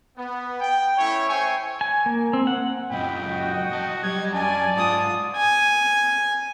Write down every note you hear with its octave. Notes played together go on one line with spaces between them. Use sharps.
B3
G5
A3 C#4 E4 C#5
C5 E5 G5 G#5 C#6
G#5
A#3
C4
F#5
F#2 A#2 D#5 G5 B5
F#4
F#3 A5
G3 G#6
F#2 D5 G#5 A5
G#2 F4 D#6
G#5